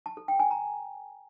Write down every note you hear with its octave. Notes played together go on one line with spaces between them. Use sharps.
A5
A4
G5
G#5
A#5